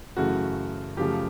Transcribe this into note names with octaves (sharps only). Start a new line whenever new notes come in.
F#2 C#3 E3 A3 F#4
F#2 C#3 F3 A3 G4